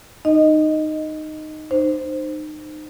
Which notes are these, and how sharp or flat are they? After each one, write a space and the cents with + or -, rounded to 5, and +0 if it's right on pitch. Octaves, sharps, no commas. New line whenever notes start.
D#4 -15 D#5 +0
D#4 -30 C5 +0